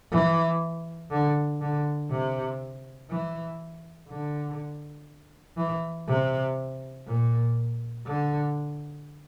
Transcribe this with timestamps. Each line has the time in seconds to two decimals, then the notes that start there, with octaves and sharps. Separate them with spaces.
0.12 E3
1.11 D3
1.61 D3
2.11 C3
3.10 E3
4.09 D3
5.58 E3
6.08 C3
7.07 A#2
8.06 D3